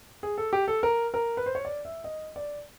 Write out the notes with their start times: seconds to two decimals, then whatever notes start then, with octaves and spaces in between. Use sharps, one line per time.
0.23 G#4
0.38 A4
0.53 G4
0.68 A4
0.83 A#4
1.14 A#4
1.37 B4
1.46 C5
1.55 C#5
1.65 D5
1.85 E5
2.04 D#5
2.36 D5